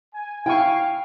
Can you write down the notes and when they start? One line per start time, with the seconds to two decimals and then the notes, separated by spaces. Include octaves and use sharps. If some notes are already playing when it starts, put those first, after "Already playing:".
0.14 G#5
0.46 E4 F5 G5 G#5 C#6